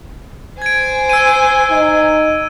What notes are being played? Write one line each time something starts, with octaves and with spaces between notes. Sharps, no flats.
C5 G#5 G#6 D7
E6 D#7
D#4